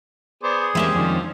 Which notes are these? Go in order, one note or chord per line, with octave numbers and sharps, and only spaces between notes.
B3 G#4 C5 D5
E2 G3 G#3 A#3 C4 C#4 G4 E5
F2 D#3 F3 D4